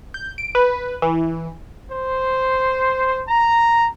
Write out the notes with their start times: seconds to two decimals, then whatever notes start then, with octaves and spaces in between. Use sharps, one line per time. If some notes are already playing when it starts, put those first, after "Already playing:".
0.14 G6
0.38 D7
0.55 B4
1.02 E3
1.91 C5
3.29 A#5